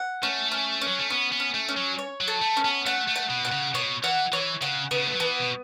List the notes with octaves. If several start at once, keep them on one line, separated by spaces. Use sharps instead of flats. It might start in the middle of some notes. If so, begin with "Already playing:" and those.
Already playing: F#5
A3 C#4
C#4
C#4
F#3
A3
B3 C#4
B3
C#4
A3
C#4
F#3
C#5
F#3
A4
A3
C#4
B3
A3 F#5
A3
F#5
B2
F#5
C#3
B2 C#5
E3 F#5
E3 C#5
C#3 F#5
C#3 B3
A3
F#3
E3 B3
B2